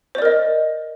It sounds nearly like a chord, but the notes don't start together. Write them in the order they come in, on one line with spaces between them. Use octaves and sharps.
C5 D5 A#4 D#5